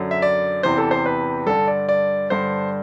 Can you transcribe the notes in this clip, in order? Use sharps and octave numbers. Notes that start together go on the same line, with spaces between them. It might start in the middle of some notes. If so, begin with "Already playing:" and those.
Already playing: F#2 D3
E5
D5
E2 C3 E3 C5
A4
C5
B4
G2 D3 A4
D5
D5
G2 D3 C5